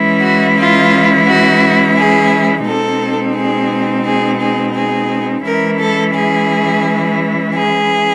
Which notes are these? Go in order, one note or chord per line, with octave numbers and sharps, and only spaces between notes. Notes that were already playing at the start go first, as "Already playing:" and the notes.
Already playing: E3 G#3 C#4 E4
F#4
F4
F#4
G#4
B2 G#3 C4 D#4 A4
G#4
G#4
G#4
G#4
E3 G#3 C#4 E4 A#4
A4
G#4
G#4